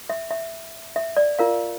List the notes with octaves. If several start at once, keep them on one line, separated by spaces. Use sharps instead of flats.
E5
E5
E5
D5
F4 A#4 F5